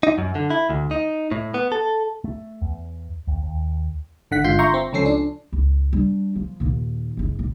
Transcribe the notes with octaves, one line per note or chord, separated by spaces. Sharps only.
D#4
F#2
D3
E4
D2
D#4
A2
B3
A4
A3
E2
D#2
D#2
G#1 D3 F#5 B6
G1 G#2 D3 F4 G6 C7
E5 A#5 C6 C#6 G6 A#6
C4
C#2 F3 C#4 A4 C7
D4
C#2
G3 D4
F3
D#2 A#2
F#1 G#3
A#1